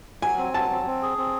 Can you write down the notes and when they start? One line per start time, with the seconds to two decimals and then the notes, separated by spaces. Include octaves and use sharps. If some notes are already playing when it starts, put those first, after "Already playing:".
0.22 F#3 G#5
0.38 C4
0.54 F#3 A5
0.70 C4
0.86 C4
1.02 G#4
1.18 C4